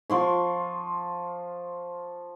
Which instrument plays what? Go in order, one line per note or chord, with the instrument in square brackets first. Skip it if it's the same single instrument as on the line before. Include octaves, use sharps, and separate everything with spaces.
[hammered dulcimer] F3 C6 C#6